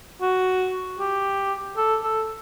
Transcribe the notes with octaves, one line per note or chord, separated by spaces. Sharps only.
F#4
G4
A4
A4